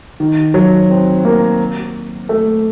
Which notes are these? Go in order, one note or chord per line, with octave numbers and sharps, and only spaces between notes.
D#3
F#3
C4
A#3
A3